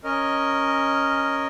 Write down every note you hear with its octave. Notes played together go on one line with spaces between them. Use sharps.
C#4 A#4 D#5